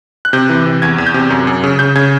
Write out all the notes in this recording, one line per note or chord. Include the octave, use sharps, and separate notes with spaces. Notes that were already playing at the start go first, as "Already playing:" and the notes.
F#6
C3 G6
E3
C3
E2 G#6
E2
G6
C3
F#2
F#2
C#3
C#3 G6
C#3 G#6